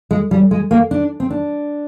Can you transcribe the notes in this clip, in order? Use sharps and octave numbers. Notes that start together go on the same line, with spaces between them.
G#3
G3
G#3
A#3
D4
C4
D4